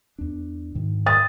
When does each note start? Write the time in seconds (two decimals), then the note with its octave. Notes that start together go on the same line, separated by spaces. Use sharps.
0.19 E2 D4
0.75 G#2 D#3
1.06 D#6 A6